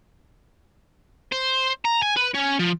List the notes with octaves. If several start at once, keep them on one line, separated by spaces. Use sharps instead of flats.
C5
A#5
G#5
B4
C#4
F3